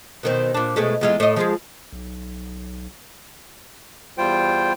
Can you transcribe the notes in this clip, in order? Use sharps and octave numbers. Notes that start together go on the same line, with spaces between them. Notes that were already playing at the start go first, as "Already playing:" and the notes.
B2 D#3 C4
A#2 D4
B2 G#3 A3
E2 G#3 F4
A2 D#5
F3 G#3 G#4
B1
E2 G3 F4 C5 G5